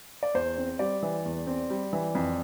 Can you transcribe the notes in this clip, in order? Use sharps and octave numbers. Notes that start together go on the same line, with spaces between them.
D5
E2 C5
C4
G3 D5
E3
E2
C4
G3
E3
F2